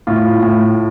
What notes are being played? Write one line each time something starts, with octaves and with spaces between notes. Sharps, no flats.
A2 F4
A2